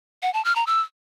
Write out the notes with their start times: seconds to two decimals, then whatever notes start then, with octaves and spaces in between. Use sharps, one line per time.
0.23 F#5
0.34 A5
0.45 F6
0.56 A#5
0.67 E6